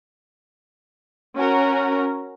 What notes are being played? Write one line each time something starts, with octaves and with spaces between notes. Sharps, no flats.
C#4 F#4 A#4